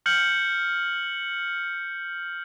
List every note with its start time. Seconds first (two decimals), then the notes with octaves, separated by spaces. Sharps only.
0.06 F6 G6 C#7 F#7